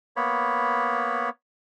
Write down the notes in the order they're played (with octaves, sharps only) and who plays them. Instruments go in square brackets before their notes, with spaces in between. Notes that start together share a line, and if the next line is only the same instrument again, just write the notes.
[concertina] A#3 B3 C#5 B5